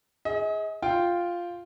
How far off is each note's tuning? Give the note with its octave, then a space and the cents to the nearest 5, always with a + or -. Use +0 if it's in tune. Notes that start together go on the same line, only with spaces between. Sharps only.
G#4 +0 D#5 +40
F4 +0 G5 +0